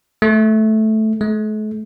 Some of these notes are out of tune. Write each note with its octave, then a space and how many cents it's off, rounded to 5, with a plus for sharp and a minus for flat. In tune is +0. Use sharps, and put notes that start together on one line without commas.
A3 -10
A3 -45